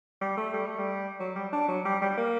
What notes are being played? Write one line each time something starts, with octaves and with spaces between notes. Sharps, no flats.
G3
A3
G3
A3
G3
F#3
G3
D4
F#3
G3
G3
A#3